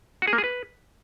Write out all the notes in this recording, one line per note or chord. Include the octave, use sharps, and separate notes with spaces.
F#4
G#4
A#3
G#4
B4